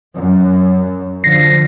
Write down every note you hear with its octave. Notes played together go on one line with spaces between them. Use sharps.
F#2
D3 F3 A#6 C7